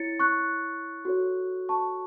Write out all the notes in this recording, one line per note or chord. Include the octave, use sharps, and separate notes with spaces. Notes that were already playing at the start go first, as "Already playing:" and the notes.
Already playing: E4 C#5 A6 C#7
C#6 F#6
F#4 A4 C#5
A5 C#6